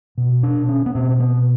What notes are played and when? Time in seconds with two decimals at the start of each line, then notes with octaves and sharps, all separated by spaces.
0.18 B2
0.43 D4
0.69 C#4
0.86 B3
0.95 B2 C4
1.20 B3